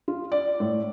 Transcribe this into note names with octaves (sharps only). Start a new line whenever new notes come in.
F4
D5
A2